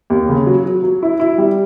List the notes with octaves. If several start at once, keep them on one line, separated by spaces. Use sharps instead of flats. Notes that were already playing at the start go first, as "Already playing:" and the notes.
D#2
C#3
F#3
F#3
F#3
E4
E4
G3